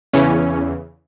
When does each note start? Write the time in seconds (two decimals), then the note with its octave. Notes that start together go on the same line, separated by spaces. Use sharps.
0.13 E2 C#3 E3 C#4